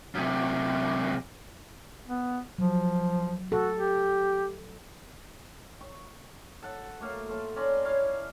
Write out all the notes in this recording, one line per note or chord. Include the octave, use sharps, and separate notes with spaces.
F#2 C3
B3
F3 F#3
F#4 A4
G4
C#6
A4 F#5
A3 A#3 F5 C#6
A3 F4 A4
C#4 D5 A#5 C6
E4 C#5 F5